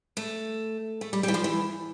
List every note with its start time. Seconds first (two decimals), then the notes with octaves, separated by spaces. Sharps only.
0.17 A3
1.01 A3
1.13 G3
1.23 G3
1.28 E3
1.34 F3
1.44 E3